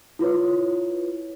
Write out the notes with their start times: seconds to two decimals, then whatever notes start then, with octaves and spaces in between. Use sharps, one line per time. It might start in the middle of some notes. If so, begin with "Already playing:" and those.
0.19 E4 F4 B4 C#5